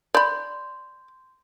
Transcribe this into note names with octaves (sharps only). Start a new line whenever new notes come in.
D5 B5 C6 G6